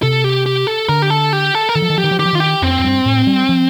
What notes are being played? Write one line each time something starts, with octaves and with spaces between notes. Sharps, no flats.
C3 A4
G4
G4
A4
D3 A#4
G4
A4
G4
A4
A#4
D#3 A4
F3
D#3
F3 G4
D#3
F3
D#3 G4
F3
D#3 F4
G4
F2 C4
F2
G2
A2
G3
F3